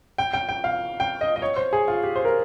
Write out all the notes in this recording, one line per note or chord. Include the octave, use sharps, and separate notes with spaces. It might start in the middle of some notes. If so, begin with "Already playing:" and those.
G5
G5
G5
F5
G5
D#5
D#5
C#5
C5
G#4
F4
G4
C5
A#4